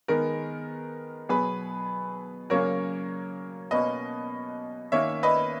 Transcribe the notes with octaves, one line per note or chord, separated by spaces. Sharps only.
D#3 G#3 B3 A#4
B2 F#3 B3 G#4 B4
C#3 F#3 A#3 C#4 A#4 C#5
B2 A#3 C#4 B4 D#5
D#3 A#3 C#4 C#5 E5
B4 D#5